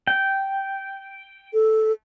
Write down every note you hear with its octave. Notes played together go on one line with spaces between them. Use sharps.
G5
A4